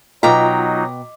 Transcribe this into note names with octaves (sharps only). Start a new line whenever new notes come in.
B2 F#3 D#4 F4 D#5 G5 A#5 D6